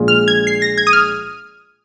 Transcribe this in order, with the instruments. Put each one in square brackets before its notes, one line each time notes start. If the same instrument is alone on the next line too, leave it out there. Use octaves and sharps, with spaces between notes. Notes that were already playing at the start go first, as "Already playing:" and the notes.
Already playing: [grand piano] A#1 A#2 G#3 F4 G#4
[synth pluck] F6
G#6
C7
A#6
G#6
D#6
F6